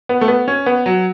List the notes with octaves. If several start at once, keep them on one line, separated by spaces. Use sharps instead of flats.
B3
A3
B3
C#4
B3
F#3